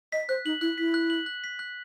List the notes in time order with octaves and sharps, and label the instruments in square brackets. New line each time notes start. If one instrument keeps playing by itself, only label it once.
[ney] D#5 [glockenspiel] B6
[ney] C5 [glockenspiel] F#6
[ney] D#4 [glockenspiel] F#7
[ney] E4 [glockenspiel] F#6
[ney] E4 [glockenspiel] B6
[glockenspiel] F#6
F#7
F#6
B6
F#6